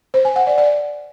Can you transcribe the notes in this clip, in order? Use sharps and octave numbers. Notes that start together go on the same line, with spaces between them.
C5
G#5
F#5
D5
D5